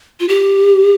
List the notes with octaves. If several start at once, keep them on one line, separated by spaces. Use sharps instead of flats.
F4
G4